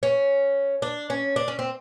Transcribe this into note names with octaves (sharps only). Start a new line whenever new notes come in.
C#4
D4
C#4
D4
C#4
C4